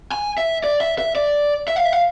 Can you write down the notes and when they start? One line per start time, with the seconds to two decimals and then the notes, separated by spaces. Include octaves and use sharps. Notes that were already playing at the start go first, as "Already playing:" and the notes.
0.12 G#5
0.38 E5
0.64 D5
0.81 E5
0.98 E5
1.15 D5
1.68 E5
1.76 F5
1.85 E5
1.92 F5